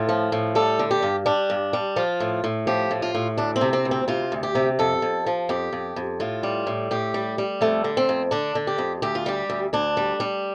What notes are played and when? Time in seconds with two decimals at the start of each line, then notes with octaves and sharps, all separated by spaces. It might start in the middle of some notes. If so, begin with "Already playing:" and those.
Already playing: A2 F4
0.09 F3
0.32 A2
0.55 G3 A4
0.79 D3
0.91 G4
1.03 G2
1.26 G3 D4
1.50 G2
1.73 G3
1.96 F3 F4
2.20 A2
2.44 A2
2.67 F3 G4
2.91 A2
3.02 F4
3.15 A2
3.38 D2 D4
3.56 C4
3.61 C3
3.73 C4
3.85 D2
3.91 C4
4.08 C3 F4
4.32 D2
4.43 G4
4.55 C3
4.79 F2 A4
5.02 F2
5.26 F3
5.49 F2 G4
5.73 F2
5.96 F2
6.20 A2 F4
6.43 G3
6.67 A2
6.91 A2 G4
7.14 G3
7.38 G3
7.61 F2 A3
7.84 D3
7.97 C4
8.09 F2
8.31 D3 D4
8.55 D3
8.67 G4
8.78 F2
9.02 D2 G4
9.15 F4
9.26 G3 G4
9.50 D2
9.73 D2 D4
9.97 G3
10.20 G3